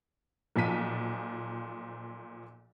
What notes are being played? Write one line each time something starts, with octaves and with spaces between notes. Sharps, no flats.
B1 A#2 F3 A5 B6 D#7